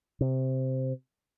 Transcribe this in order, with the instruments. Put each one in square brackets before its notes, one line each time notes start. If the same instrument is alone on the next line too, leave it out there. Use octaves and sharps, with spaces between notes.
[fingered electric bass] C3